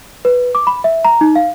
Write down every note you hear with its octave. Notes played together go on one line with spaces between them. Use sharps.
B4
D6
B5
E5
A#5
D#4
F5